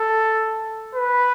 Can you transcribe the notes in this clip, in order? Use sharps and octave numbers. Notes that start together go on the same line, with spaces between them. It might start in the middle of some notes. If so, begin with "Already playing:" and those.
Already playing: A4
B4